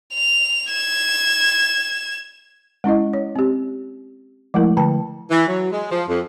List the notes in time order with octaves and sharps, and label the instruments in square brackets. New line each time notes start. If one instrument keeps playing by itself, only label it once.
[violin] F7
G#6 E7
[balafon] G#3 C#4 E4 D#5
C#5
C4 G4
F3 G#3 A3 E4 A#4
D3 G5 A5
[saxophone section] E3
F#3
G#3
F3
F2